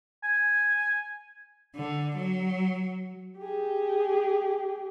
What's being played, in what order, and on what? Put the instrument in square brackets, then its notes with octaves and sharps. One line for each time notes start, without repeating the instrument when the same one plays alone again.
[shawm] G#5
[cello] D3
F#3
[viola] G4 G#4